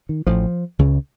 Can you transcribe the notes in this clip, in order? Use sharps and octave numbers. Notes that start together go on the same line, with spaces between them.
D#3
A1 A2 F3
C#2 C#3